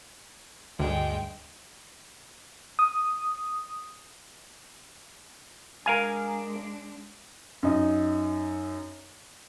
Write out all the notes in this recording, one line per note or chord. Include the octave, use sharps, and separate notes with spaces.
D2 G2 G#3 G5
D#6
G#3 D4 A#4 F5 G#5
F#2 D#4